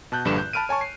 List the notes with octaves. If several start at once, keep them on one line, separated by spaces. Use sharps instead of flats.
B2 A5 F#6 G6
A#1 G2 D3 B4 E7
G6
A5 B5 F6 D7 D#7
C#5 G#5 A5 C#6
C7